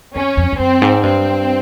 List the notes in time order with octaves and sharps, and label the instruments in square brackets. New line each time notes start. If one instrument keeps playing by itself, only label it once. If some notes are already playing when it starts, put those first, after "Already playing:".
[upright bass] F2 [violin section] C#4
[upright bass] F2
F2
[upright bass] F#2 [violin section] C4
[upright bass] G#2
[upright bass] G2 [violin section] C4